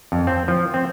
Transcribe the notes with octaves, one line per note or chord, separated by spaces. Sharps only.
F2
C4
F3
C4